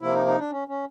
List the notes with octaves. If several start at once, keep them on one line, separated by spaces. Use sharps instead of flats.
C3 F3 A#3 E4
D#4
D#4
D4
C#4
C#4